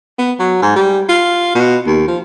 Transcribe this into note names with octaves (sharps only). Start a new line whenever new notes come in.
B3
F#3
G#2
G3
F4
B2
D#2
F3